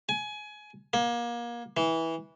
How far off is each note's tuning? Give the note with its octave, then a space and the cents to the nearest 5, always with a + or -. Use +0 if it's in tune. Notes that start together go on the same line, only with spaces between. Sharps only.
G#5 +20
A#3 +30
E3 -15